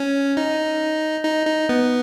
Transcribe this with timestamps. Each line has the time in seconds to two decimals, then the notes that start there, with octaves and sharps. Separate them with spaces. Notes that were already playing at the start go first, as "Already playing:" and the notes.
Already playing: C#4
0.37 D#4
1.24 D#4
1.47 D#4
1.69 B3